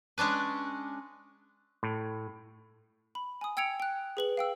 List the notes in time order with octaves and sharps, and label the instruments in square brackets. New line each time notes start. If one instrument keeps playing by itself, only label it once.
[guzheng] G#3 C#4 D4 B4
[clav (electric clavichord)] A2
[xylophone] B5
G#5 D#6
G5 E6 G#6 C#7 D7 F7
G5 F#6
G#4 B4 F#7
F5 G5 E6